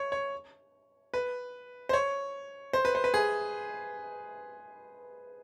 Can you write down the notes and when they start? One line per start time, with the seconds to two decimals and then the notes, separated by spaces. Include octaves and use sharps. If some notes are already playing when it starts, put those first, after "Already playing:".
Already playing: C#5
0.12 C#5
1.14 B4
1.89 C5
1.93 C#5
2.73 C5
2.85 B4
2.95 C5
3.04 B4
3.14 G#4